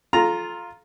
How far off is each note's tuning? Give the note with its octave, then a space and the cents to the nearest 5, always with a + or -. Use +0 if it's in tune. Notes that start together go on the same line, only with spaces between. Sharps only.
F4 +0 A4 -30 A#5 +0